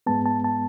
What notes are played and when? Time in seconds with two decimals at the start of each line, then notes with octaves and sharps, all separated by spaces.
0.06 G#2 G#3 B3 A5
0.26 A5
0.44 A5